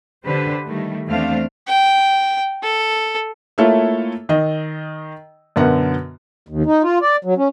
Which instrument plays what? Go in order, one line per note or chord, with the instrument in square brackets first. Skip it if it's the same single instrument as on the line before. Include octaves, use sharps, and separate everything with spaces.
[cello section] D3 G4 B4 C5
D#3 G3 A3
E2 A3 C4 D4 C5 F5
[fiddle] G5
A4
[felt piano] A3 A#3 E4 F4 A4 C#5
D#3 D#5
F#2 B2 D3 B3 A#4 F#5
[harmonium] D#2
D#4
F4
D5
F#3
C#4